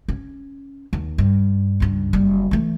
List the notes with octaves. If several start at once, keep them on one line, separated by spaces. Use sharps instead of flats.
C#4
D#2
G2
C#2 G2
F#1 G3
E3 A3